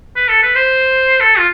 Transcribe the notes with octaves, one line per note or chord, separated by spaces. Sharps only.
B4
A4
B4
C5
A4
F4